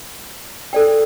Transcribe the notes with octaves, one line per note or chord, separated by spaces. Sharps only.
A4 D5 G5